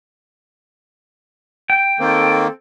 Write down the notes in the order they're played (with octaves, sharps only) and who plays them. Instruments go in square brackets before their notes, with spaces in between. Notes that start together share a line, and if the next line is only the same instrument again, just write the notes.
[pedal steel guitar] G5
[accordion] D#3 A#3 [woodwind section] C4 A4